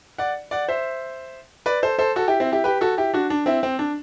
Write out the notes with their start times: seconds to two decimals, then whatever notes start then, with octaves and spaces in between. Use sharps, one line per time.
0.18 D5 F#5
0.51 D5 F#5
0.68 C5 E5
1.66 B4 D5
1.83 A4 C5
1.99 A4 C5
2.16 F#4 A4
2.28 E4 G4
2.40 C4 E4
2.52 E4 G4
2.64 G4 B4
2.81 F#4 A4
2.98 E4 G4
3.14 D4 F#4
3.30 D4
3.46 C4 E4
3.63 C4
3.79 D4